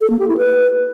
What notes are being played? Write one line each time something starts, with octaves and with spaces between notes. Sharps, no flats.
A4
A#3
G4
E4
B4